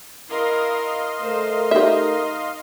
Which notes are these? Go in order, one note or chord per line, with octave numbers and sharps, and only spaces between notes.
E4 A#4 D#5 F5 C6
A3 A#4 C5
D#4 G4 E5